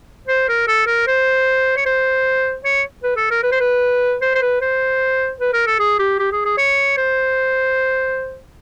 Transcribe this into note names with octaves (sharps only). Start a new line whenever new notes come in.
C5
A#4
A4
A#4
C5
C#5
C5
C#5
B4
A4
A#4
B4
C5
B4
C5
C5
B4
C5
B4
A#4
A4
G#4
G4
G4
G#4
G#4
C#5
C5